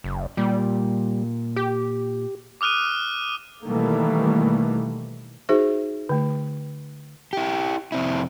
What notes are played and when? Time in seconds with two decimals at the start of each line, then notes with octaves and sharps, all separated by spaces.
0.04 F#1
0.37 A#2 G3
1.56 G4
2.61 D6 D#6 F6 F#6 D#7
3.66 B2 D#3 E3 G3 A3 A#3
5.49 D#4 F#4 G#4 C5 E5
6.09 D3 A3
7.33 E4 G4
7.92 F2 C3 C4 E4